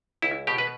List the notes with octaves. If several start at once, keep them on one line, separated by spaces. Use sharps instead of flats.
C#2 E4
B2 G4
B4